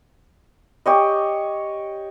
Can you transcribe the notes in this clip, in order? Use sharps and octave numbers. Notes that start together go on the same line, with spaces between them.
G4 C#5 D#5